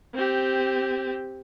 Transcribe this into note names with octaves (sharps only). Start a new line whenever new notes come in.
C4 G4